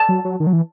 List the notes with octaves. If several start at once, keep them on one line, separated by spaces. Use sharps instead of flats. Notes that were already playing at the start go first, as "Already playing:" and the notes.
Already playing: A5
F#3
F#3
D#3
F#3
E3